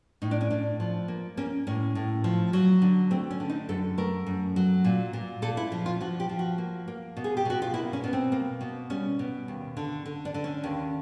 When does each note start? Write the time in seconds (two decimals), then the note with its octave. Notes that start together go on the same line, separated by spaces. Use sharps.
0.22 A2 D#4
0.31 D4
0.41 C#4
0.50 A2 D4
0.80 F3
1.08 A#3
1.37 A#3 C#4
1.67 A2 C#4
1.95 A2
2.24 F3
2.53 F#3
2.82 D3
3.11 A3 C4
3.31 C#4
3.40 D3
3.50 D#4
3.69 F#2 A4
3.98 A3 A#4
4.26 F#2
4.56 F#3
4.84 A#2
5.13 A#2
5.42 A#2 A4
5.57 E4
5.72 F3
5.86 F4
6.01 F3 F#4
6.20 G4
6.29 F3
6.39 F#4
6.58 A#3
6.88 A#3
7.17 B2
7.24 G#4
7.37 G4
7.45 B2 F#4
7.62 F4
7.74 A#3 E4
7.93 C#4
8.04 B2
8.13 C4
8.32 A#3
8.61 B2
8.90 G3 C#4
9.19 B2
9.48 D#2
9.77 D3
10.06 D3
10.25 D4
10.34 D3
10.44 C#4
10.64 D#2